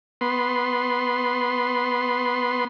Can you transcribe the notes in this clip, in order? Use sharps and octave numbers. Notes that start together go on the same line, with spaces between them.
B3 C6